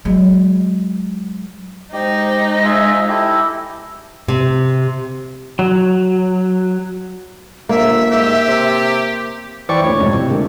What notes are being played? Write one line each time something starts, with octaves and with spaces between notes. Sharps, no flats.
F#3 G#3
G#3 D#4 G4 C5
F4 G#4 E5
E4 G4 A4
C3
F#3
G1 A#3 E5
G#2 G4
C3
E3 C5 D5 G5 B5 C#6
D2 A#2 C#5
F2 G#2 C3
A2 C3
D3 G#3 A#3